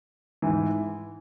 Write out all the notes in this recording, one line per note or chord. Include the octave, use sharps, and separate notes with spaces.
G#2 E3